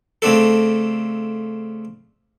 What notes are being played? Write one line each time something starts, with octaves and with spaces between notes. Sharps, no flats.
C#3 A3 C4 D4 A4